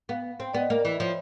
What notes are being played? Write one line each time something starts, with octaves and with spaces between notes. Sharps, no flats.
B3 F5
C4
B3 D5
D#5
A#3
E3 D5
F3 C#5